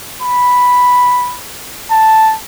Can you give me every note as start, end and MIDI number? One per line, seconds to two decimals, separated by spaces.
0.22 1.39 83
1.91 2.35 81